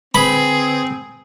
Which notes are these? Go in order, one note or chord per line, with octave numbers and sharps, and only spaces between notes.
D3 C4 G#4 B4 B5